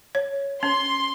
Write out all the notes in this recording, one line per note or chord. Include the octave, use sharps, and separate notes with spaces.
C#5
C#4 C6